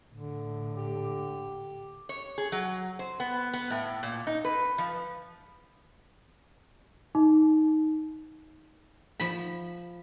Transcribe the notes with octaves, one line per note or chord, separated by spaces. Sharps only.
A2 D3
G4
C#5
G#4
F#3
C5
B3
B3
A2
A#2
D#4
B4
F3
D#4
F3 B5